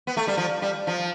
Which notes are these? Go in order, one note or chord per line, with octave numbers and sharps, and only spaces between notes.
B3
A3
G3
F3
G3
F3